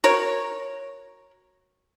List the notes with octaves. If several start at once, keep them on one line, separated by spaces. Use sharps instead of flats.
F#4 A#4 C#5